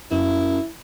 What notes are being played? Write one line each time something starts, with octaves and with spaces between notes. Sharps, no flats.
F#2 E4